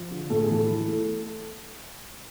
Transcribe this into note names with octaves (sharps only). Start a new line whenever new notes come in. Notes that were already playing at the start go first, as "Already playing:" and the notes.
Already playing: F3
D3
A2 A4
G#4
E3 A4
E3
A3